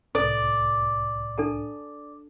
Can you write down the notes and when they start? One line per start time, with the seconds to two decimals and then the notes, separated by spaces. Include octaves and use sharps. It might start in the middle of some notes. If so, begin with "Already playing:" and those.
0.15 C2 A2 A4 D5
1.38 D4 A4 A5